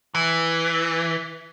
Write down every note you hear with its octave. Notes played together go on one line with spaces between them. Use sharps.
E3